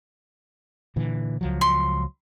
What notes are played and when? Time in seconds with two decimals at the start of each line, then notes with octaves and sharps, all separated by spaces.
0.96 A#2 D3 E3
1.41 C#2 F3 F#3
1.61 C6